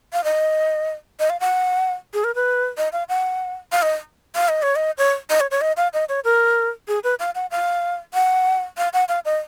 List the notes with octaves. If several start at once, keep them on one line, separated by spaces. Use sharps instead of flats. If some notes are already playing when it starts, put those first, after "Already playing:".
F5
D#5
D#5
F5
F#5
G#4
A#4
B4
D#5
F5
F#5
F5
D#5
F5
D#5
C#5
D#5
C#5
D#5
C#5
C#5
D#5
F5
D#5
C#5
A#4
G#4
B4
F5
F#5
F5
F#5
F5
F#5
F5
D#5